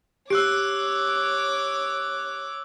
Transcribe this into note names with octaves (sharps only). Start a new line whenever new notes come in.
G4 C#5 D6 E6 F#6 D7